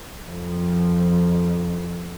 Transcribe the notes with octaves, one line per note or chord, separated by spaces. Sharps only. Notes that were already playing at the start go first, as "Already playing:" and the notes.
F2 F3